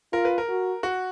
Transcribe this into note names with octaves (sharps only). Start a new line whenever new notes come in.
F4 A#4
B4
A#4
F#4
F#4